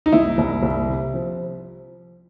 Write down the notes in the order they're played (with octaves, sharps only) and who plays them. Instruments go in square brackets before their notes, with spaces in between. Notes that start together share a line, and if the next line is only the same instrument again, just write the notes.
[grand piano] D#4
[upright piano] C2 [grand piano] E4
[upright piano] C2
C2
C3
F3